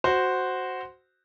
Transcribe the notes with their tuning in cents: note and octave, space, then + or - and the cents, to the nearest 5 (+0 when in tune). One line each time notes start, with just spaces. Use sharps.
F#4 +0 C5 -5